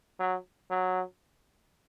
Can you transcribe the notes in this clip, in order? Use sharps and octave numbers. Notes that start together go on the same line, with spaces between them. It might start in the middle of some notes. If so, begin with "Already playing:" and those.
F#3
F#3